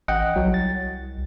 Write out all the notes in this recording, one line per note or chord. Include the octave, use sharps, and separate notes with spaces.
A1 D#5 F#5 G5
C2 F#3
A6